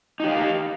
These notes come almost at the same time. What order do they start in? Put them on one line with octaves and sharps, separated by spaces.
D#4 G4 F5